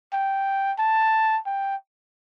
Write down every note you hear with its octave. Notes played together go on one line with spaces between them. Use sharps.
G5
A5
G5